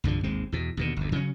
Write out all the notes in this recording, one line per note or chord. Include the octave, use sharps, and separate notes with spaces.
C2 G2 D3 F3
G#1 D#2 G#3 C4
E2 B2
D#2 B2 D3
G1 D2
C#3 F#3 A3 C#4